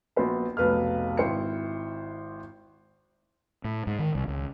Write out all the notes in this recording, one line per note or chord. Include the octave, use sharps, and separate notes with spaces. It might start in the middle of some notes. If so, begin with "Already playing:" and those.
A#1 B3 F#4 C5 B5
F1 B1 B4 F5 F6
G#1 E4 C5 G5 C#7
A2
G#2
D#3
C2
C#2